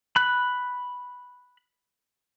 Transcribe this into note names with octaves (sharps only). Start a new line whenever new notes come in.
B5 F#6